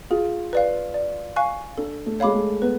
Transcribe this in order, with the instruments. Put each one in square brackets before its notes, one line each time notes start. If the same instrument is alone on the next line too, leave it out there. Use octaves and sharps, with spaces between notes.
[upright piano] F4 [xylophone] G#4
[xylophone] B4 D5 F5
D5
F5 G#5 C#6 F#6
[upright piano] D4 [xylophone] A4
[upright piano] A3
[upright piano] G#3 [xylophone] C#5 F5 B5 D6
[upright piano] A3
[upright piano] B3 [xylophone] B4